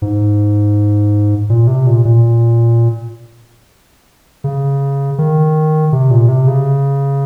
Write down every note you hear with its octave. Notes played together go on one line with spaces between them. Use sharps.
G#2
A#2
C3
A#2
A#2
C#3
D#3
C3
A#2
C3
C#3